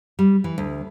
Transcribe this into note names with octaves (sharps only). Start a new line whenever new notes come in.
G3
E3
D2